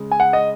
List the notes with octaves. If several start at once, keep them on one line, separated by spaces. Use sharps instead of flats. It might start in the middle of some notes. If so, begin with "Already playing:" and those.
Already playing: C#3 G#3
G#5
F#5
D#5